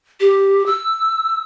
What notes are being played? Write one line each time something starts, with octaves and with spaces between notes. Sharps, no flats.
G4
E6